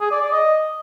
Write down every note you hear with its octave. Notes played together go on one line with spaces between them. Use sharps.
G#4
D5
D5
D#5